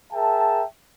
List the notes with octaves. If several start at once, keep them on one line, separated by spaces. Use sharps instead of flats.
G#4 A#4 E5 G5 A5